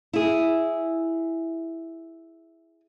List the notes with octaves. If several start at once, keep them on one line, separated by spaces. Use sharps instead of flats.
E4 G#4